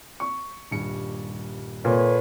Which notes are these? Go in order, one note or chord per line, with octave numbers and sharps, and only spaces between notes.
C#6
D#1 G2 C#7
A#2 A4 B4 C#5